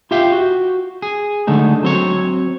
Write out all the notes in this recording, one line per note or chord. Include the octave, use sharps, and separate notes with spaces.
F4 G4 E5 F5 G5
F#4
G#4
D3 G#3 A3 D#4
F#3 C4 C#5